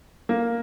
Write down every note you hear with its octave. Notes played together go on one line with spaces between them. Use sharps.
A#3